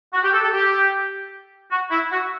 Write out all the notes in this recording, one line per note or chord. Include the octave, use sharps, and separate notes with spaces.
F#4
G4
A4
A4
G4
F#4
E4
F#4